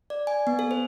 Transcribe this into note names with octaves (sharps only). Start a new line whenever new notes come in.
D5
G#5
B3
A4
C5